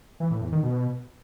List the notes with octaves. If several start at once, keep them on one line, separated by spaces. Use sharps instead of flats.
E3
A2
E2
D#3
B2